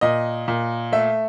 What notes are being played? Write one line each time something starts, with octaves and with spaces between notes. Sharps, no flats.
A#2 D#5
A#2
A3 E5